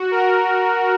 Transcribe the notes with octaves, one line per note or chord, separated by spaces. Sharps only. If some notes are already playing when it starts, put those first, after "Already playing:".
Already playing: F#4
A#4